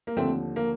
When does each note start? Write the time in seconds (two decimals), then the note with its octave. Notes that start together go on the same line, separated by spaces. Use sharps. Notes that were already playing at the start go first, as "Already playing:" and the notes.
0.07 A#3
0.17 D#2 D3 F3 A3 C4
0.56 A#3